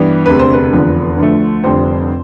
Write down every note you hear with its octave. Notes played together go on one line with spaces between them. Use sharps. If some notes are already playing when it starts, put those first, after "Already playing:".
Already playing: G2 E3 G3 B3
E1 D2 C3 B4
C5
B4
F1 E2 D3 F3
D2 D3 F3 A3
F1 F2 D3 G3 C4 C5